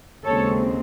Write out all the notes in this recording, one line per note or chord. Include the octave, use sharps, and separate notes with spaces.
D#2 C#3 G#3 C4 A4 C#5